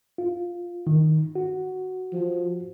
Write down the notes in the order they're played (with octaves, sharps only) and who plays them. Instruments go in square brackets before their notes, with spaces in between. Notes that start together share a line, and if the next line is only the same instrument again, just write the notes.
[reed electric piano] F4
D#3
F#4
[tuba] F3